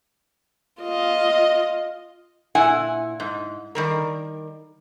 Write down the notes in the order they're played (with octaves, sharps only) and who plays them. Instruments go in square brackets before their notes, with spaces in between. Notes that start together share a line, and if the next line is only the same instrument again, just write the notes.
[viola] F4 D#5
[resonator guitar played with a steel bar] A#2 E4 F#5 G#5
G#2
D#3 G3 A#4